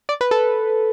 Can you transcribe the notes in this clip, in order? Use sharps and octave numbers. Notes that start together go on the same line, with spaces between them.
D5
B4
A4